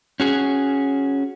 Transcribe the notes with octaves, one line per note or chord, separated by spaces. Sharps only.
C#4 F#4 G#4